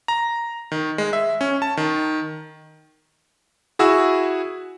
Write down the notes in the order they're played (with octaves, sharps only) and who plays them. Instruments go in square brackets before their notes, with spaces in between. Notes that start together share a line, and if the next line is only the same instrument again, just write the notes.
[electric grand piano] A#5
D#3
G#3
E5
C#4
A5
D#3
E4 F#4 G#4 E6